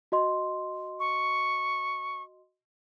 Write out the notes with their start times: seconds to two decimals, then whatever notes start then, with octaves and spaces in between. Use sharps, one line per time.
0.12 F#4 D#5 C6
1.00 C#6